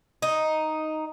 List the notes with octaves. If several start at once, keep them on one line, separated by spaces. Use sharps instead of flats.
D#4